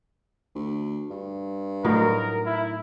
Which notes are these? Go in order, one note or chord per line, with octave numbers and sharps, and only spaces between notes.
D2
G2
A2 F#3 D#4 A#4
E4